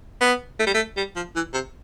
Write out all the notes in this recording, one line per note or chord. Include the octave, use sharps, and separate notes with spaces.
B3
A3
G3
A3
G3
F3
E3
C3